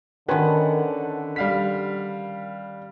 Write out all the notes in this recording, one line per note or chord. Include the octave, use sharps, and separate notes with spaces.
D3 D#3 C#4 B4 F#5 G5 A5 C6
G3 F5 B6